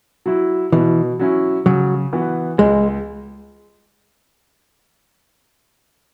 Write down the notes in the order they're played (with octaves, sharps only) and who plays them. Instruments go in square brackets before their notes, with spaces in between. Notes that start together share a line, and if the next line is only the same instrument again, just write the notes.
[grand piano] F#3 E4
[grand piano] B2 [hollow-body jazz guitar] E3
[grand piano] F#3 C#4 E4
[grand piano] C#3 [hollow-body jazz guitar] F#3
[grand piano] E3 B3 F#4
[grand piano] C#2 [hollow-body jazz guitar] G#3